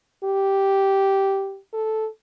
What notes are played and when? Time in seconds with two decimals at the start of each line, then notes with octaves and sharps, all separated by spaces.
0.24 G4
1.74 A4